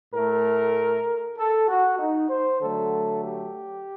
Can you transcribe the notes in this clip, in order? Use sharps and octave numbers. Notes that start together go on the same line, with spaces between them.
A2 A3 A#4
A4
F#4
D#4
C5
D3 F#3 A3 A4
G4